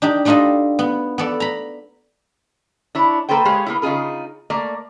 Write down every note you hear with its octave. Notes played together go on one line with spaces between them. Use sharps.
D4 D#4 G4
G3 D4 D#4 F4 A4 D#5
B3
B3 A4 D5
A#5 B5
D4 E4 C#5
A#3 A4 B4 C5 G5
G#3 G4 G#4 C#5 F5
A#3 B3 E4
C#3 D#4 F4 G#4 A#4
A3 A#3 D5